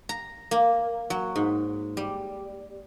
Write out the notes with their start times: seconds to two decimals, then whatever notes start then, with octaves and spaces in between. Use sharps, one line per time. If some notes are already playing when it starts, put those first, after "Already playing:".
0.09 A#5
0.51 A#3
1.10 F#3
1.36 G#2
1.97 G3